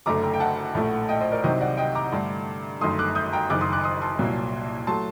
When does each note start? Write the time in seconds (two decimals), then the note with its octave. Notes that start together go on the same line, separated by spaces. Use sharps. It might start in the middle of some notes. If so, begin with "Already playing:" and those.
0.06 F#1 F#2 D3 A3 A#5 D6
0.23 G5 A#5
0.34 G5
0.40 F#5 A5
0.75 A#1 A2 A3
1.09 D#5 G5
1.21 C5 D#5
1.32 A#4 D5
1.44 C2 C3 D#3 F#3 C5 D#5
1.61 D5 F#5
1.77 D#5 G5
1.95 A#5 D6
2.12 G2 D3 A3
2.81 G1 F#2 D#3 A3 C6 D#6
2.99 D6 F#6
3.15 D#6 G6
3.33 G5 A#5
3.50 F#1 F#2 D#3 D6 F#6
3.61 C6 D#6
3.73 D6 F#6
3.84 C6 D#6
4.02 A5 C6
4.19 C2 A#2 F#3 A#3
4.87 F#3 A3 A5 C6